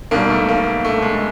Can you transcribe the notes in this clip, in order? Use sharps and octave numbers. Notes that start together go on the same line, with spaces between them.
B1 B2 G3 A#3
A3
A#3
A3
G#3